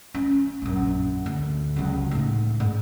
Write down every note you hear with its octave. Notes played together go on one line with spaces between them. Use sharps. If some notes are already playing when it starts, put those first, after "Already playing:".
C#4
A#1 F#2
D2
C#2 F#3
A2 D#4
G#2